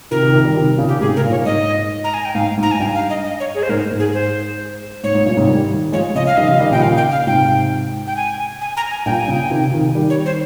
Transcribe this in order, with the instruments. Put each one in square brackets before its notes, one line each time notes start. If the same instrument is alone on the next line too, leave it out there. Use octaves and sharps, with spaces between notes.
[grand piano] C3 D#3 [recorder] A#4
[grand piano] C3 D#3
C3 D#3
D#3 G3
C3 D#3
A#2 C#3
[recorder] G4
[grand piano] G#2 C3 [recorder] G#4
[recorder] A#4
[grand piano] G2 A#2
[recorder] C#5
[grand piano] G#2 [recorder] D#5
[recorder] A#5
G#5
G5
[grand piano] G#2 [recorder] F5
[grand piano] G#2
[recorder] A#5
G#5
[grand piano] G2 [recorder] G5
[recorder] F5
D#5
D#5
C#5
G#4
C5
[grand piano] G#2 [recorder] A#4
[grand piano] G#2
[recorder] G#4
C5
[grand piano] G#2 [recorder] C#5
[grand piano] G#2
G2 A#2
G#2 C3
D#3 G3
[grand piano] F3 G#3 [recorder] C#5
[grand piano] C#3 F3 [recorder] D#5
[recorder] F5
[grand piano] D#3 G3 [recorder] D#5
[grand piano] C#3 F3 [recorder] F5
[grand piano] D#3 G3 [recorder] D#5
[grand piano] A#2 C#3 [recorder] G5
[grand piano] A#2 C#3 [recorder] F5
[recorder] G5
F5
[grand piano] G#2 C3 [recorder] G5
[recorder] G5
G#5
G#5
A#5
G#5
[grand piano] G2 A#2 [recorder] G5
[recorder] G#5
[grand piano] A#2 C#3 [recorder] G5
[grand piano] C3 D#3
C3 D#3
D#3 G3
[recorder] C#5
C5